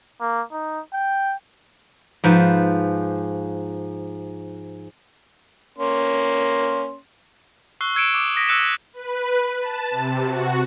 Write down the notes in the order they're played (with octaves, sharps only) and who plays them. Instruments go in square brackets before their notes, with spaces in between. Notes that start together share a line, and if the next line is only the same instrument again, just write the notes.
[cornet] A#3
D#4
G5
[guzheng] G#2 F3 B4
[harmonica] A#3 C#4 C6
[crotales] C#6 E6 F#6 C7 G7
E6 G#6 C#7 D7 E7
D6 D#6
D#6 A#6 B6 D7
C#6 E6 F#6 C#7 D#7 E7
[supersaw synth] B4
A5
C3
F#4